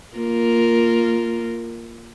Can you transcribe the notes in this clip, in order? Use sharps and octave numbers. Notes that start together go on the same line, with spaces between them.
A#3 F4 A#4